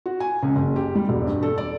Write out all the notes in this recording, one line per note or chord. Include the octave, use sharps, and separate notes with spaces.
F#4
G#5
C#2
F#1
G4
G3
E1
G2
A4
D5